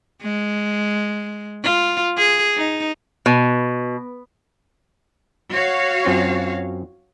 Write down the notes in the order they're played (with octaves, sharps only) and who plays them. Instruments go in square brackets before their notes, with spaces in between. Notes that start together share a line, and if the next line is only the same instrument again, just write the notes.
[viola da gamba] G#3
F4
G#4
D#4
[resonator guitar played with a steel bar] B2
[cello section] F#4 C#5 F5
[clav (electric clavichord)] F#2 C4 F4